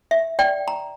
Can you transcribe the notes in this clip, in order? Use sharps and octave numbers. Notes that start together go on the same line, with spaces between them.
E5
D5 G5
A#5